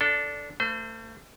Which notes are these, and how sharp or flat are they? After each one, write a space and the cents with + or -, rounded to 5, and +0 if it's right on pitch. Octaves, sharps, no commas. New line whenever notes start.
D4 -15 A4 +0
A3 +35 C5 -35